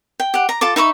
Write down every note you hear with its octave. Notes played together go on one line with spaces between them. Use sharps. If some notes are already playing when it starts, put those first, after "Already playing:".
G5
G4 F#5
A#5
F4 A4 A5 D6
D#4 E5 B5 C#6